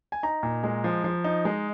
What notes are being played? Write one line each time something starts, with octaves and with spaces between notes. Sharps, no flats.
G#5
D#4 A#5
A#2
G#3
F3
F3
D#4
G#3